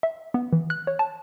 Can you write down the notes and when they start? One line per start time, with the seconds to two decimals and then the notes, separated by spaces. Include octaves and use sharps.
0.03 E5
0.34 B3
0.53 E3
0.70 F#6
0.87 C#5
0.99 A5